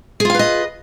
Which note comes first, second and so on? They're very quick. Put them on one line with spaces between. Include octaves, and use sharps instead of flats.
G#4 F4 F5 B4 D#5